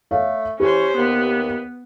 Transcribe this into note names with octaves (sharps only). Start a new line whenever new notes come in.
A3 A4 C#5 F5
E3 C#4 G4 C5
D#2 B3